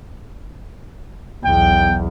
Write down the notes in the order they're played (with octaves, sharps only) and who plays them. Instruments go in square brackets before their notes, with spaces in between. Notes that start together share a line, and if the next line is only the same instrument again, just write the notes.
[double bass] B1 E2 [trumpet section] G5